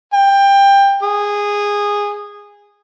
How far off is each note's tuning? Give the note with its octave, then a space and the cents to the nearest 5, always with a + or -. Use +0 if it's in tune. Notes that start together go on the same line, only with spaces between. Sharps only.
G5 +20
G#4 -15